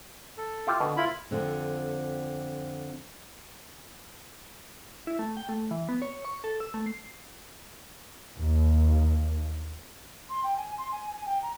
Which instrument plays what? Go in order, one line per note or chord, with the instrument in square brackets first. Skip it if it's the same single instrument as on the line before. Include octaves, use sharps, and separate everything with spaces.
[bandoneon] A4
[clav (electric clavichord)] E4 F4 G4
[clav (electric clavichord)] B2 [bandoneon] D3
[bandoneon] E4 F4 B5
[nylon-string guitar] F2 D3 C4
[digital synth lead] E4
A3
G5
A3
E3
B3
C#5
C#6
A4
E6
A3
C7
[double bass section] D#2
[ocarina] C6
G5
G#5
C6
G#5
G#5
G5
A#5